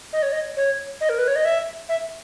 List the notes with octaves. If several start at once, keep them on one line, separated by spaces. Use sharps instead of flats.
D#5
C#5
D#5
C#5
D#5
A#4
B4
C#5
D#5
E5
E5